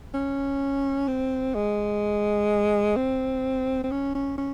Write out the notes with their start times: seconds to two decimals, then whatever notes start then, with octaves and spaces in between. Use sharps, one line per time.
0.14 C#4
1.08 C4
1.55 G#3
2.97 C4
3.84 C4
3.92 C#4
4.15 C#4
4.38 C#4